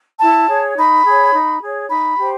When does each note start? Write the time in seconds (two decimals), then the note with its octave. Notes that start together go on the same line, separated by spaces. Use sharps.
0.21 E4 A5
0.49 G#4 C#5
0.77 D#4 B5
1.05 G#4 C#5
1.33 D#4
1.62 G#4 C#5
1.89 D#4 B5
2.18 G4 C5